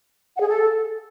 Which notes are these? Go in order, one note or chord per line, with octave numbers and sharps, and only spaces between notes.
F#5
G#4
A4